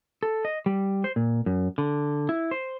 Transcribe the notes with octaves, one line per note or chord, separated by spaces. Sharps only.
A4
D#5
G3
C5
A#2
F#2
D3
E4
C5